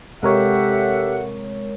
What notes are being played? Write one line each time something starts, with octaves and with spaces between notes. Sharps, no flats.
C3 G#3 G4 A4 A#4 C#5 E5 F#5